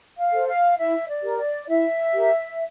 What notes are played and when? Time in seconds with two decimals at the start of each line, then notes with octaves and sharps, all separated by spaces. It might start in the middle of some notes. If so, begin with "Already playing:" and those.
0.18 F5
0.32 A4 C5
0.47 F5
0.78 E4 E5
1.09 D5
1.23 G4 A#4
1.38 D5
1.69 E4 E5
2.14 G4 A#4